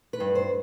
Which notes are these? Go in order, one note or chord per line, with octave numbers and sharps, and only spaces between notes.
B4
G2
C5